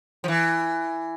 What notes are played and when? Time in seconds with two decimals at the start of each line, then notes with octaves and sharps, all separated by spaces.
0.24 F3
0.28 E3